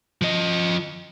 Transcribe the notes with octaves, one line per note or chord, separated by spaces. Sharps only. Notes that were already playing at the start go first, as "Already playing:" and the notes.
F3 D#5